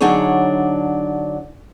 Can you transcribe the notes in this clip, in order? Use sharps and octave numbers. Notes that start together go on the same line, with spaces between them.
D3 F#3 D4 D#4 G#4 C#5